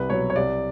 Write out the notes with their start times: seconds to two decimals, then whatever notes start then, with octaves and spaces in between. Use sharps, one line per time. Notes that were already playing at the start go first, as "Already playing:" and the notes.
Already playing: C2 B4
0.10 B2 F#3 C#5
0.30 C#5
0.36 C2 D5